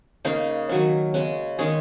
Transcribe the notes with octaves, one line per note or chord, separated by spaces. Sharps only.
C#3 A#3 C#4 D#4 G#4
D#3 F#3 C#4
C#3 G#3 C#4
D#3 G#3 C#4 D#4 G#4